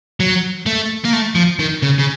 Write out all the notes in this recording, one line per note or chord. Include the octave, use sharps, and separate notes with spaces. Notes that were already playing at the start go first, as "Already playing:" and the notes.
F#3
A3
A#3
A3
F3
D#3
C#3
C#3